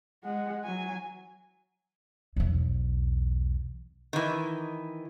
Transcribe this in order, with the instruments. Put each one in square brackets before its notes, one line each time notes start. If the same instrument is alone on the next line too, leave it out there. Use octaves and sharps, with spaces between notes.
[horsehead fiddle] G#3 F#5
F#3 G#5
[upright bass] B1 E2
[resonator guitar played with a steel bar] D#3 E3